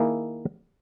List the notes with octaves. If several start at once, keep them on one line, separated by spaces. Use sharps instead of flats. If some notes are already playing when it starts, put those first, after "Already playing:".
Already playing: D#3 A#3 E4 G#4